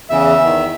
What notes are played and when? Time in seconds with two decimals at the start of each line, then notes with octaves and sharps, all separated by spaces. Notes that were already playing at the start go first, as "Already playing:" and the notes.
0.10 E2 C#3 E3 E5
0.40 E2 D#3